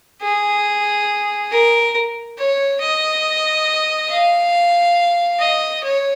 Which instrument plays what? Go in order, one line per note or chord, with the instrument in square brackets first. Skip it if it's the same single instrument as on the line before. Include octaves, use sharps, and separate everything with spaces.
[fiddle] G#4
A#4
C#5
D#5
F5
D#5
C#5